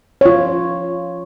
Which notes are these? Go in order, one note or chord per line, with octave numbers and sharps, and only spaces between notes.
F4 C#5